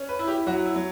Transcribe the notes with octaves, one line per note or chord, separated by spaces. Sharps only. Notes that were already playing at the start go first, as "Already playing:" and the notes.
Already playing: C#4
B4
E4
G4
F#3 F#4
E4
F#3